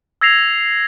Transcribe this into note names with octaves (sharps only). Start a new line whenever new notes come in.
E6 G#6 A#6 C7 F7